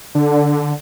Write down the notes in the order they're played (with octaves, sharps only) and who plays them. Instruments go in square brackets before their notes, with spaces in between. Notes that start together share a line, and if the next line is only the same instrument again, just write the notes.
[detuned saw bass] D3